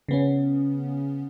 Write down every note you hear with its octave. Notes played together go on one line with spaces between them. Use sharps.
C#3 B3 C#4